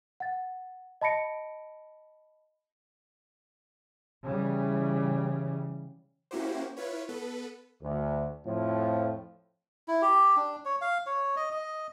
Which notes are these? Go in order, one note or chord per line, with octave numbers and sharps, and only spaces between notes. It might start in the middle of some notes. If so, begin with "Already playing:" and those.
F#5 A6
D#5 A5 B5 A#6 C#7 D7
C#3 E3 G3
A#3 C#4 E4 F#4 G4 C5
E4 F4 B4 C#5
B3 A4 B4
D2
F2 A2 F3
E4
G4
D4
C#5
F5
C#5
D#5
D#5